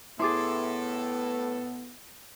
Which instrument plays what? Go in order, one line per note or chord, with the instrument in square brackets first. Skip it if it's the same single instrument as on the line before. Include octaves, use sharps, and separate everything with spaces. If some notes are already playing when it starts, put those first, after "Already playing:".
[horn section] A2 A4 [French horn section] B3 [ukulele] E4 G#4 [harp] C6 D6 A6